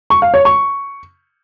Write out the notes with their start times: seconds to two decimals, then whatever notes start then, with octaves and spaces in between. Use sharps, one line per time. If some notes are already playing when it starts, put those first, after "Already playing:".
0.10 C#6
0.22 F5
0.34 C#5
0.45 C#6